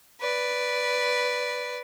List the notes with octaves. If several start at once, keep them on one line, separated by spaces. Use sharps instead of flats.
B4 D5